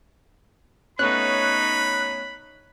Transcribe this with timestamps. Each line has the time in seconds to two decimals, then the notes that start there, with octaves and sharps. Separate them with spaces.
0.99 A3 B3 C#4 D#4 C#5 B5 F#6